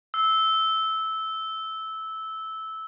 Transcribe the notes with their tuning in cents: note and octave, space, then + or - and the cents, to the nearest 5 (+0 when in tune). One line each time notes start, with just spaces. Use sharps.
E6 -15